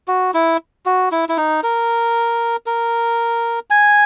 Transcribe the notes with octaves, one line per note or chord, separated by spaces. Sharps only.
F#4
E4
F#4
E4
E4
D#4
A#4
A#4
G#5